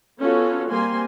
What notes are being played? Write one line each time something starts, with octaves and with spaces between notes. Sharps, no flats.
B3 C#4 F4 F#4 A4 C#5
G3 A#3 C4 G#5 C6